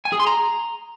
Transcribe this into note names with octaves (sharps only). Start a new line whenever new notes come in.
G#5
G#4
C6
A#5